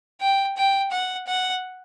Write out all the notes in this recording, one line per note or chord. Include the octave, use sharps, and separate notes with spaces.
G5
G5
F#5
F#5